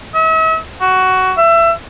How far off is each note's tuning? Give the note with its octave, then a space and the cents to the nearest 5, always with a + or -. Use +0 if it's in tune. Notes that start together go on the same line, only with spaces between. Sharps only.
E5 -40
F#4 +15
E5 +25